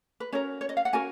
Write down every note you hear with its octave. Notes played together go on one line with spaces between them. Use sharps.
B4
C#4 F#4 A#4 C#5
C#5
D#5
F5
F#5
C#4 F#4 A#4 G#5